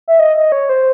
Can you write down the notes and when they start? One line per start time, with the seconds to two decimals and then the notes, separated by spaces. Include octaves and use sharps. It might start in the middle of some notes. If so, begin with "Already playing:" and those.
0.08 E5
0.19 D#5
0.36 D#5
0.52 C#5
0.69 C5